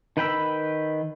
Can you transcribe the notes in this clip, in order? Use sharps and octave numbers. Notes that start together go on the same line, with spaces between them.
D#3 B4 G5 B5 E6